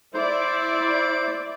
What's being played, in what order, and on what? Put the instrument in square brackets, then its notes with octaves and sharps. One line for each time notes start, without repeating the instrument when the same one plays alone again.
[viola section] E4 D5 [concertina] C5